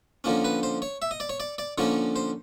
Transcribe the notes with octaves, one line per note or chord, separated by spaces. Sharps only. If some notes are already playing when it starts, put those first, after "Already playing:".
D3 F3 A#3 C#4
B4
C5
C#5
E5
D#5
D5
C#5
D5
D5
D3 F3 A#3 C#4 C#5
C5